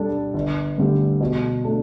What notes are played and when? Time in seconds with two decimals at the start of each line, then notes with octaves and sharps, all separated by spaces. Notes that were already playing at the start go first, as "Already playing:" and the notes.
Already playing: G2 G3 D4 A4
0.34 G1
0.78 G2 D3 A3 G4
1.21 B2
1.64 A3 D4 A4